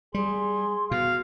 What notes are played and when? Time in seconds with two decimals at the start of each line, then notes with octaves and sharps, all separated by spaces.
0.14 G3 G#4 C6
0.91 B2 F5